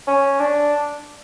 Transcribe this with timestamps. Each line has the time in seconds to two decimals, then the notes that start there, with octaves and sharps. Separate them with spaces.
0.07 C#4
0.40 D4